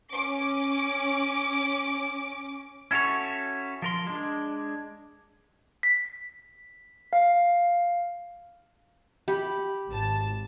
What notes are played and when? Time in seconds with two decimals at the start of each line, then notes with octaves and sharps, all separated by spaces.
0.13 C#4 D6
2.91 C#4 E4 F#4 A4 C#5
3.82 F3 A#4 C6
4.07 G#3 D4
5.83 B6
7.13 F5
9.28 G4 B5
9.89 G#1 A5